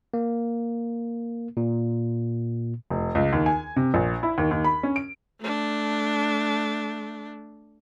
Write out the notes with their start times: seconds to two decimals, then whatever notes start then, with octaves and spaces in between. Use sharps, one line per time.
0.14 A#3
1.57 A#2
2.90 F1
3.15 C#2
3.33 D#2
3.46 G#5
3.76 C3
3.94 A#1
4.23 E4
4.38 D#2
4.51 D#2
4.64 B5
4.83 C#4
4.96 D7
5.40 A3 D4